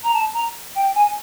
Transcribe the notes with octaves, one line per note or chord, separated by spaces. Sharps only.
A#5
A5
A#5
G5
G#5